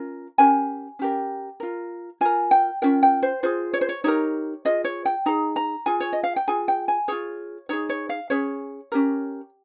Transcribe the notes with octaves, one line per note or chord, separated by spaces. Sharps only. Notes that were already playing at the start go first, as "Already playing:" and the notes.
Already playing: C#4 F4 A#4
C#4 G4 A#4 G#5
C#4 G4 A#4
F4 A#4
F4 A#4 G#5
G5
C#4 F4 A#4 G5
G5
C5
F4 G#4 C5
C#5
C5
C#5
D#4 G4 A#4 C#5
F4 G#4 D#5
C#5
G5
D#4 G#4 A#5
A#5
F4 G#4 G#5
C#5
D#5
F5
G5
F4 G#4 G#5
G5
G#5
F4 G#4 C#5
D#4 G#4 C#5
C#5
F5
C#4 G#4 C#5
C#4 G4 A#4